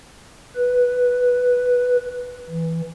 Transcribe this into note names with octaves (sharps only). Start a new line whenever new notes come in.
B4
E3